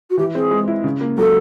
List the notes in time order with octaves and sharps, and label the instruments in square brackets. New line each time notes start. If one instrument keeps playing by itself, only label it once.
[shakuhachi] F#4
[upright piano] E3 [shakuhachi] G4
[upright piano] C4 [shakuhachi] G#4
[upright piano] G#3
E4
C#3
A#3
[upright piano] F#3 [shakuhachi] A4